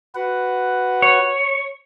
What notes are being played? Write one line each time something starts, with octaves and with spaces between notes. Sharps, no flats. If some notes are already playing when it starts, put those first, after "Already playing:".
F#4 B4 F#5
C#5